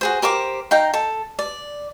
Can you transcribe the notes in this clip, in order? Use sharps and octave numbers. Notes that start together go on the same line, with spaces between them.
F#4 G#4 C5
G4 A#4 C5 D6
D#4 F5 G5 A#5
A4
D5